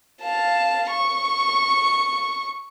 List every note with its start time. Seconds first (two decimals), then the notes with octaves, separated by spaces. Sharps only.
0.22 F5 A5
0.91 C#6